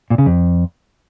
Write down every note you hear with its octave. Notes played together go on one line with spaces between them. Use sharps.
A#2
C#3
F2